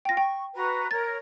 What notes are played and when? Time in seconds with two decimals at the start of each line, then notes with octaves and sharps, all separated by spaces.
0.05 F4 G5 A#6
0.17 G5 C#6
0.54 F#4 B4 A#5
0.91 A#4 C#5 A#5 A6